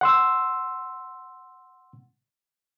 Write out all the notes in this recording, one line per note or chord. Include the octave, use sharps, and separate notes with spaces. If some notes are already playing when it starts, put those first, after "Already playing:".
F#5 C6 E6